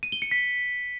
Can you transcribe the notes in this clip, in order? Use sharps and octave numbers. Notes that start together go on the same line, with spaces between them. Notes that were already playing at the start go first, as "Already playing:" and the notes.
D#7
G7
C#7
B6